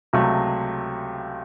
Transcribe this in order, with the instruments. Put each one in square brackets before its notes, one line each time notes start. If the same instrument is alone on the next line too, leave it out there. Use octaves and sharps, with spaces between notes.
[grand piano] C#2 C3 F#3 A3